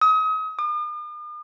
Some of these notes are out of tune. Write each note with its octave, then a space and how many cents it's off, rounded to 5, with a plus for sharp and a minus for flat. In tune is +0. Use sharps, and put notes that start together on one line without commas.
D#6 +35
D#6 -45